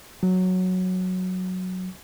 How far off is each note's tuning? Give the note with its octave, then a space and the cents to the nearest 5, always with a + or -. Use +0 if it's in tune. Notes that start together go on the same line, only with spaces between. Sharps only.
F#3 -5